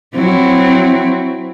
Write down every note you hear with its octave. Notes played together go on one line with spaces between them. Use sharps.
F#3 C4 E4